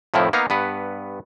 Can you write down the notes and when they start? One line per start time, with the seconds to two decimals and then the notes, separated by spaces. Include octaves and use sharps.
0.14 F2 A2 D#3 F3 E4
0.33 A#3 B3 D#4 F5
0.50 G2 B3 B4